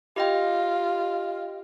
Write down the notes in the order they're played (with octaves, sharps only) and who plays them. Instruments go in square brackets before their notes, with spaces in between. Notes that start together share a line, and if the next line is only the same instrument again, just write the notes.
[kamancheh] F4 [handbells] G4 D#5 G5